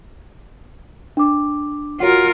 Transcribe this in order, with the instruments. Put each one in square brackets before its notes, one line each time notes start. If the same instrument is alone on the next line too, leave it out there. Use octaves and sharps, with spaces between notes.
[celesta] D4 D6
[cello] F4 A#4 [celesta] F#4 C#5 F#5